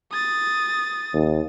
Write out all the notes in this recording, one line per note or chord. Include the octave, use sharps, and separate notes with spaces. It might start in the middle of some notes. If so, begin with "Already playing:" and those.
D#6 A6
D#2